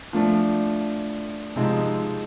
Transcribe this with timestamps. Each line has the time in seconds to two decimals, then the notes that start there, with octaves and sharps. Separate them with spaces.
0.13 F3 A3 D4
1.56 C3 F3 G#3 C4 D#4